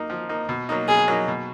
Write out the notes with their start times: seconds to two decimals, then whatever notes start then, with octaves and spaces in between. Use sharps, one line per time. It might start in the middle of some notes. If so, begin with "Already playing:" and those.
Already playing: A#3 D#4
0.10 F3
0.29 A#3 D#4
0.49 B2
0.69 F#3 A#3 D#4
0.88 B2 G#4
1.08 F#3 A#3 D#4
1.28 B2